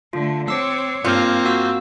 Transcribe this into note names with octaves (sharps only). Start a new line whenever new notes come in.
D3 A3 F4
C4 C#5 D6 E6
G2 A#3 C4 F4
F#4 F5 E6